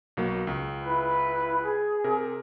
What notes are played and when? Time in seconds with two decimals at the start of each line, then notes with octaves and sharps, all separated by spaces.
0.17 B1 F#3 A#3
0.47 C#2
0.84 E4 B4
1.62 G#4
2.04 C3 A#4